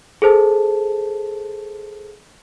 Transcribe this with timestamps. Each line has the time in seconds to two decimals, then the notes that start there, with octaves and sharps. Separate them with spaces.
0.22 G#4 A4 C5 A5